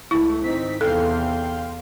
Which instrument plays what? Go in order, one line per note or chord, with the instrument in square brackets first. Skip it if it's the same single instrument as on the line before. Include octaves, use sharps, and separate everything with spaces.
[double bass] C#2 A3 [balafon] E4
[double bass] G#1 C4 [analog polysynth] D#4 B6
[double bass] E2 C3 [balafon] A4 [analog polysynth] F5 G5 C6